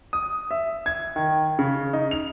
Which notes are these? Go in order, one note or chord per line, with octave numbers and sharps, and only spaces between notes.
D#6
E5
G#6
D#3
C#3
D#4
F7